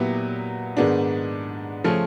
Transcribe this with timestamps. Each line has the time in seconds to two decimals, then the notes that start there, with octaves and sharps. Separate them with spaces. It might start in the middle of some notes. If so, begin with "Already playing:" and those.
Already playing: A#2 F#3 B3 E4 G4
0.77 G#2 D#3 G#3 B3 D4
1.84 C#3 F3 A3 C#4